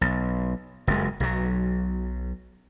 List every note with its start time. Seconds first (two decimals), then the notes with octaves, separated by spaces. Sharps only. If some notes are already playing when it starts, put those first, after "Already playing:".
0.01 B1
0.87 F#1 F2 G#3
1.20 B1 F#3